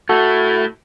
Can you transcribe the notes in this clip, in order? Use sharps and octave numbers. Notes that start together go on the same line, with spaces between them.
A3 E4 F#4 A4